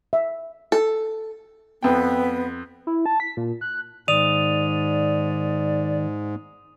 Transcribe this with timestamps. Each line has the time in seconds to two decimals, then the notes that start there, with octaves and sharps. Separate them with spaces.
0.13 E5
0.72 A4
1.83 F2 B3 G5
2.87 E4
3.06 A5
3.20 B6
3.37 A#2
3.61 F#6
4.08 G#2 D#3 D5 D#6 D#7 F7